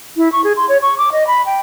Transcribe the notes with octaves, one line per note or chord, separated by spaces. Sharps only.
E4
C#6
G#4
C6
C#5
C#6
D6
D#5
B5
G5